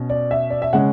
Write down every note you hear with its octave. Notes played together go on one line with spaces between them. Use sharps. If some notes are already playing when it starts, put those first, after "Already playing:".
Already playing: B2 C#4
D5
E5
D5
E5
C#3 G#3 C#4 F#5